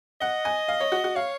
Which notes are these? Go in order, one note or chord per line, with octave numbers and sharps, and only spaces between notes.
D#5 F#5
G#5
F5
C#5
F#4
F#4
C#5 F5